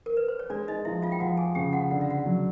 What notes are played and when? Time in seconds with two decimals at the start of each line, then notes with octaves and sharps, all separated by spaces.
0.06 A#4
0.17 B4
0.28 C5
0.39 C#5
0.50 G#3 D4 D5
0.68 D#4 D#5
0.85 F3 E4 E5
1.02 F4 F5
1.12 G5
1.20 F3 F#4 F#5
1.37 G#4 G#5
1.55 C#3 G4 G5
1.73 F#4 F#5
1.91 D3 F#5
2.01 F5
2.10 F#4 F#5
2.26 F#3